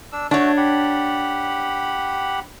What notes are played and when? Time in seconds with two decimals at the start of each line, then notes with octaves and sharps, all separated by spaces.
0.12 D4 E6
0.31 A3 D4 F#4 C#5
0.57 G4 F#5 B5